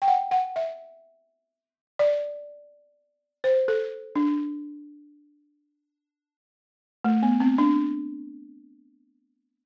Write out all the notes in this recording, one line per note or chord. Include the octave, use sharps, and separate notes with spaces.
G5
F#5
F#5
E5
D5
C5
A4
D4
A3
B3
C4
D4